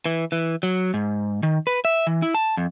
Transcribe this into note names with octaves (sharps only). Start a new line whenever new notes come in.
E3
E3
F#3
G#2
D#3
B4
E5
E3
E4
A5
F2